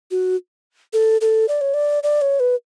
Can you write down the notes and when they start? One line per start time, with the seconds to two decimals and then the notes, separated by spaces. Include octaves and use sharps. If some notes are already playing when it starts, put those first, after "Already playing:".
0.11 F#4
0.93 A4
1.21 A4
1.48 D5
1.61 C#5
1.74 D5
2.03 D5
2.21 C#5
2.40 B4